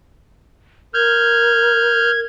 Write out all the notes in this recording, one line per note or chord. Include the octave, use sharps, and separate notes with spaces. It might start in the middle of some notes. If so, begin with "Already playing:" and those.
A#4 F6 G6 G#6